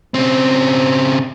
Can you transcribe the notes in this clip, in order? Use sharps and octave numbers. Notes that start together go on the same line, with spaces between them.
C#3 C4